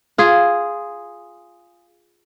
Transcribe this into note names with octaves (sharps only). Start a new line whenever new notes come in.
F4 G#4